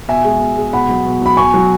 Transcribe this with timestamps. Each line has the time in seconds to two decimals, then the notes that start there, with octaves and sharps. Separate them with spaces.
0.08 B2 E5 G#5
0.24 G#3
0.40 B2
0.57 G#3
0.73 B2 F#5 B5
0.89 F#3
1.06 B2
1.21 F#3 B5
1.37 B2 G#5 C#6
1.54 F#3